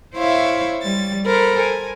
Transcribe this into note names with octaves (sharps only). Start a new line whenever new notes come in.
E4 C5 C#5 E5 F5
G3 A6
A4 A#4 C5 B5
G#5